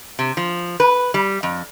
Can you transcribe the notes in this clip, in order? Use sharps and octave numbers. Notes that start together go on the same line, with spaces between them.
C3
F3
B4
G3
F2